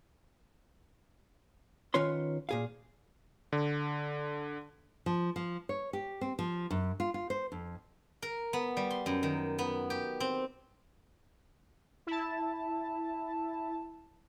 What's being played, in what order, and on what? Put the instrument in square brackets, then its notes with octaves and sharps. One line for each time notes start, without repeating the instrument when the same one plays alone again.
[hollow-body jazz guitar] D#3 C#4 F4 B4 C#5 C6
A#2 G#4 F5
[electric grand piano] D3
[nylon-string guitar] F3
F3
C#5
G4
C4
F3
F#2
F4
F4
C5
F2
[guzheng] A#4
B3
G3
C6
F#2
D#3
B3
G4
C4
[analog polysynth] E4 A5